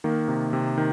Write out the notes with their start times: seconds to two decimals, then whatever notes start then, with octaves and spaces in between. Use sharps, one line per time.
0.04 D#3 A#3
0.28 C3
0.53 C3
0.78 D#3